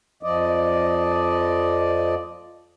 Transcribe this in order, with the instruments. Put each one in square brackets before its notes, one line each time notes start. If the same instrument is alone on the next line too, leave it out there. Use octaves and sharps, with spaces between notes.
[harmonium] F2 F3 D5 D#5